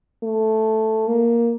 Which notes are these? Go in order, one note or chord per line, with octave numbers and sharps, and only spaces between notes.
A3
A#3